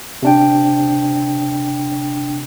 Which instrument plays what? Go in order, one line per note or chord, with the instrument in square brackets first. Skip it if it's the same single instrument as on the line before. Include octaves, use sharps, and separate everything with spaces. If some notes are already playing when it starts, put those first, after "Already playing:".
[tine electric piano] C3 D4 G5